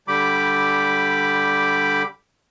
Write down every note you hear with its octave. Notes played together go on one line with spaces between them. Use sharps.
D3 G3 G4 B5 D6